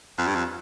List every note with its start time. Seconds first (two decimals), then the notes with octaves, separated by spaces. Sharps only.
0.19 F2
0.27 G2
0.35 F2